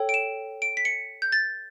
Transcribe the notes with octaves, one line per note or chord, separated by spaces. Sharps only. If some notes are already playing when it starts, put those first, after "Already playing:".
Already playing: A4 C#5 G5
D7
E7
D7
B6
C#7
G6
A6